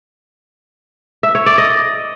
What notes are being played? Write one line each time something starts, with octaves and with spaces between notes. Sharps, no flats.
E5
C#5
D5
D#5